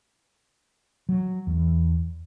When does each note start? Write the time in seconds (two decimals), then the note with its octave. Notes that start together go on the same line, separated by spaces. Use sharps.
1.09 F#3
1.47 E2